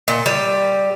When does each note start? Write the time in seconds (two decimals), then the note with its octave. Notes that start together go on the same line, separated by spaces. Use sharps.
0.08 A#2
0.26 G3